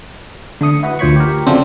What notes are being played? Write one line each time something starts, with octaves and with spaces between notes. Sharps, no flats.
D3 A3 D#6 C#7
E4 F#4 B4
D2 F3 C5 C#5 B5 C#6
G4 A#4
C#3 F3 F#3 A3 C4 D4